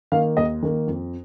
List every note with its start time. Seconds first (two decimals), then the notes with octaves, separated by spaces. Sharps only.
0.12 D#3 A#3 F5
0.37 D#2 D#5
0.63 D#3 A#3
0.87 F2